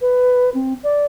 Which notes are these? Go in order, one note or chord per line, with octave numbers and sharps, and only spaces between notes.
B4
C4
D5